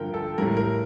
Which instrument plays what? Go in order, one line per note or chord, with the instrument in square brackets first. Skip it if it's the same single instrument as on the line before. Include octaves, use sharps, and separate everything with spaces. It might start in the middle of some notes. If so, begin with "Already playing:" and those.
Already playing: [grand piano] G2 D3 F3 A#4 G5
A4
A2 G3 A#4
A#4